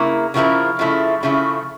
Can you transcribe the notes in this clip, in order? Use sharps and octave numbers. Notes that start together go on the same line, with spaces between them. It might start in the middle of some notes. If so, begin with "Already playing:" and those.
Already playing: C#3 A#3 E4 A#4
C#3 F3 A#3 E4 A#4
C#3 F3 A3 E4
C#3 F3 A3 E4